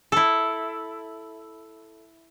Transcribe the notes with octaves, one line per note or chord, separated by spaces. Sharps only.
E4 A4